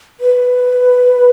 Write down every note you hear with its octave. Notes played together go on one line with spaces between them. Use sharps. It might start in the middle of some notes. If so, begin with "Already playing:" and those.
B4